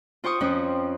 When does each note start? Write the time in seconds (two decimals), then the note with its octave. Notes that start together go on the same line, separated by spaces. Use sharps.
0.24 F4 C5 G5 C#6 D#6
0.41 F2 F3 C#4 C5